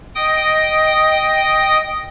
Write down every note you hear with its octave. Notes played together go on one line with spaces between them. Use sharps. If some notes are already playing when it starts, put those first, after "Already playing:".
D#5 G5 D#6